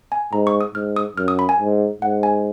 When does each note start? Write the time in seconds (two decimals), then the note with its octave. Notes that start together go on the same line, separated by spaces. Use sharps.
0.12 G#5
0.33 G#2 A#5
0.47 C#6
0.61 D#6
0.75 G#2 F6
0.96 D#6
1.17 F#2 F6
1.28 D#6
1.39 B5
1.49 G#5
1.60 G#2
2.02 G#2 F#5
2.23 G#5